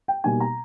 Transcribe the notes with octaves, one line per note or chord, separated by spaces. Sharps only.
G5
B2 G3 A#3 D#4 G#5
A#5